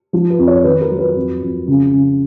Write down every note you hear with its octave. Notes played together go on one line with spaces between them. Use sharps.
F3
B4
F2
C#5
D#3 B4
A#4
F#3
B4
F2
F2
C#3
C#3